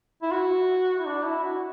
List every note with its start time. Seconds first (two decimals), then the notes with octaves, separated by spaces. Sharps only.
0.22 E4
0.31 F#4
0.99 E4
1.07 D4
1.25 E4
1.44 F#4